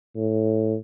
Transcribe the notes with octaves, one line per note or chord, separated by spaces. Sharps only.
A2